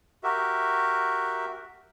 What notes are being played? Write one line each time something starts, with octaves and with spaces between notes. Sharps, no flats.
F#4 G4 A#4 E5